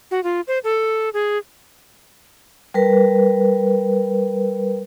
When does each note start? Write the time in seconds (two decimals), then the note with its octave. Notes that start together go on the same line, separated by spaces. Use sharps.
0.11 F#4
0.24 F4
0.48 C5
0.64 A4
1.14 G#4
2.74 G3 A#4 B4